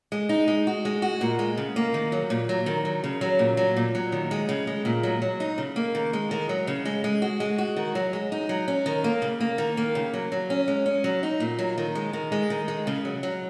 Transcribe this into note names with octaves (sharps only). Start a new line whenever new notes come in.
G#3
D#4
G#3
F#4
G#3
F#4
A#2
G#3
C#3
A#3
D#3
F#3
A#2
F#3
D#3
F#3
C#3
F#3
A#2
F#3
A#2
F#3
D#3
G#3
C#3
G#3
A#2
F#3
F#3
D#4
C#3
A#3
D#3
G#3
D#3
F#3
C#3
G#3
G#3
F#4
G#3
F#4
D#3
F#3
G#3
D#4
F#3
C#4
D#3
A#3
C#3
A#3
D#3
A#3
C#3
F#3
F#3
C#4
G#3
C#4
F#3
D#4
A#2
F#3
D#3
G#3
D#3
G#3
D#3
G#3
C#3
F#3
F#3